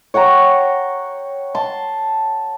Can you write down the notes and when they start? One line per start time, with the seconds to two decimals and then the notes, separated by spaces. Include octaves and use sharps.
0.14 C#5 F#5 G5 A#5
1.55 A5 C6